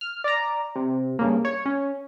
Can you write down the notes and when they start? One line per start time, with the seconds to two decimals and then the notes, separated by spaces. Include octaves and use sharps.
0.01 F6
0.24 D5 A#5
0.76 C3
1.19 G2 C#3 A#3
1.45 C#5
1.66 C#4